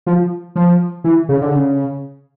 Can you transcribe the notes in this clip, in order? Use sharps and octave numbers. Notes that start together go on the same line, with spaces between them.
F3
F3
E3
C#3
D3
C#3